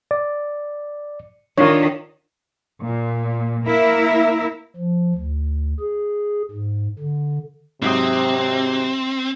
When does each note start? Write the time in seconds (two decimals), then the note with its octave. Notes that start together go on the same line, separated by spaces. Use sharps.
0.11 D5
1.58 D#3 D4 F4 C#5
2.83 A#2
3.65 A#3 E4 A#4 E5
4.77 F3
5.15 D2
5.80 G#4
6.51 G#2
6.99 D3
7.82 G#2 C3 F#3 C4 E5 G5 D#6